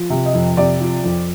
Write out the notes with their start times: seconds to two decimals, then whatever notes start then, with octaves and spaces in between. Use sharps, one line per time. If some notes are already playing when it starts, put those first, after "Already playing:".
Already playing: F3
0.10 C3
0.26 D#5
0.34 F2
0.57 C3 D5
0.80 F3
1.04 F2